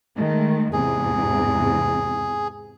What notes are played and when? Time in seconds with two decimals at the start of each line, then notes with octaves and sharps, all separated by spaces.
0.17 D#3 G#3 A3
0.73 E2 G#2 C3 G#4